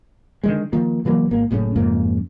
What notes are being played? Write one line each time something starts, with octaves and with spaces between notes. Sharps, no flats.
D3 D#3 G#3
D#3 F3 A#3
C#3 E3 F#3 A#3
G#1 A#3
F#1 A2 C#3 C#4
F2 G#2 C#3 A#3